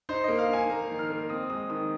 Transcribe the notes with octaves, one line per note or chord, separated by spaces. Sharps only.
D#4 C5
A#3 D#5
F5
D#4 G#5
A#3 A#5
D#3
F6
A#3
C4 D#6
G#3 D#6
D#3 D#6